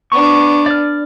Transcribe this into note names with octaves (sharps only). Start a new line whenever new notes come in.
B3 D4 C#6
D5 F6